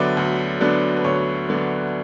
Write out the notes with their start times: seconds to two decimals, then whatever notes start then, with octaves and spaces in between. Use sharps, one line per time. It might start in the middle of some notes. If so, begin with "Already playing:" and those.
Already playing: D2 D3 F#3 B3 D4 D5 E5
0.17 D2
0.61 D3 F#3 B3 D4
0.97 B4
1.04 D2 C#5
1.49 D3 F#3 B3 D4